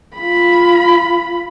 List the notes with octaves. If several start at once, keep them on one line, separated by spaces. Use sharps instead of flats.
F4 B5